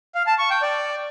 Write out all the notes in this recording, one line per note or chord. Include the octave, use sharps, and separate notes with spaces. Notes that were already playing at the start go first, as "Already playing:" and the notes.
F5
A5
C#6
G5
D5